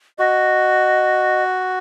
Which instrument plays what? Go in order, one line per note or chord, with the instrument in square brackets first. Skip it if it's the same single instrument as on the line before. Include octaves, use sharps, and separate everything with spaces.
[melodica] F#4 [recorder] D#5